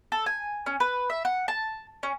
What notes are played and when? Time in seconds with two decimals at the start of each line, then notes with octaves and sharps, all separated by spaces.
0.12 A4
0.26 G#5
0.66 C#4
0.80 B4
1.10 E5
1.25 F#5
1.48 A5
2.03 C#4